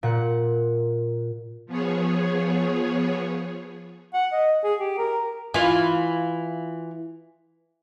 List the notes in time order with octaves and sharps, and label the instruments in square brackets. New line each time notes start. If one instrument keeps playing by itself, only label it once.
[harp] A#2 F#5
[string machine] F3 B3 G#4 C#5
[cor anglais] F#5
D#5
G#4
G4
A#4
[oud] E3 F4